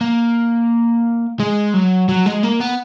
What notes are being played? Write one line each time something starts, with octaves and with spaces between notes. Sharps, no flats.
A#3
G#3
F#3
F#3
G#3
A#3
B3